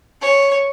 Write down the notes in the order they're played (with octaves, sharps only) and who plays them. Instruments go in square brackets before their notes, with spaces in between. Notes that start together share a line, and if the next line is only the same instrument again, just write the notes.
[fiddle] C#5